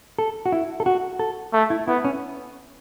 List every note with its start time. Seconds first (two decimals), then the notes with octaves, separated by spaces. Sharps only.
0.18 A4
0.46 F#4
0.52 E4
0.80 A4
0.86 F#4
1.19 A4
1.53 A3
1.70 E4
1.88 B3 E4
2.05 C#4